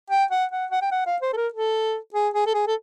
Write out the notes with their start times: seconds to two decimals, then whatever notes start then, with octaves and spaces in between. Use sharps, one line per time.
0.10 G5
0.30 F#5
0.51 F#5
0.71 F#5
0.81 G5
0.91 F#5
1.06 F5
1.22 C5
1.33 A4
1.37 A#4
1.53 A4
2.14 G#4
2.33 G#4
2.46 A4
2.54 G#4
2.67 A4